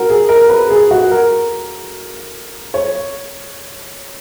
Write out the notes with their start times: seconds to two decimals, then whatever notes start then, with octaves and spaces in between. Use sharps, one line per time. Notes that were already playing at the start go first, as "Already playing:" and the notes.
Already playing: F#4 A#4
0.09 G#4
0.29 A#4
0.49 B4
0.70 G#4
0.91 F#4
1.11 A#4
2.74 C#5